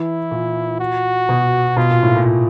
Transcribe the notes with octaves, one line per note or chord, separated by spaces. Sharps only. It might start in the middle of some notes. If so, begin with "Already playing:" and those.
Already playing: E3 E4
A#2
F#4
B2
B2 F4
A#2
A2
A#2